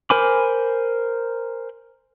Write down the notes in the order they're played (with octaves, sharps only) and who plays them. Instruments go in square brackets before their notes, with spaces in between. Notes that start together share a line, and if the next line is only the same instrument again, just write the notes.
[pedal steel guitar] A#4 C5 G#5 B5 D6